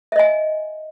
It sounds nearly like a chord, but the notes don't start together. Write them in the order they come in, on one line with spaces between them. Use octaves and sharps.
E5 D#5 G#5